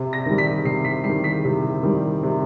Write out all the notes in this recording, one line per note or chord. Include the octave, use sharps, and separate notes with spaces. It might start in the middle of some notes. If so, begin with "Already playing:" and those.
Already playing: C3
A#6
D#3 G3
B6
C3 C7
B6
D#3 G3 C7
B6
C3
D#3 G3
C3